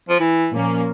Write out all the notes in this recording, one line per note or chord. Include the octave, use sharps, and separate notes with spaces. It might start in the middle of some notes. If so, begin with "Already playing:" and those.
F3
E3
A#2 F3 A#3 C#4